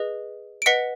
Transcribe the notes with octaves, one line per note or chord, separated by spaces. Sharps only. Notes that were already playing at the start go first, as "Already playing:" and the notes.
Already playing: G#4 B4 D#5
D7
B4 D#5 F#5 B6 C#7